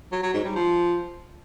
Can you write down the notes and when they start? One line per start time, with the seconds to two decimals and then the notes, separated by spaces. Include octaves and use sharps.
0.12 F#3
0.23 F#3
0.34 G#2
0.44 G3
0.55 F3